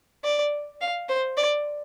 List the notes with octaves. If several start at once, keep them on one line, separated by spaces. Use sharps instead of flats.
D5
F5
C5
D5